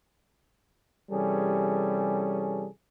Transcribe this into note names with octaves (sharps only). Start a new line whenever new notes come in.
C3 E3 G3 C#4 G#4 A4